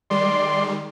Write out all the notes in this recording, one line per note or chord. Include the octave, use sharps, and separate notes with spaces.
D#3 G3 G#3 D5 C6